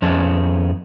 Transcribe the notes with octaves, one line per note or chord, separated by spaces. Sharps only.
F2 B3 C#4 G#4 A5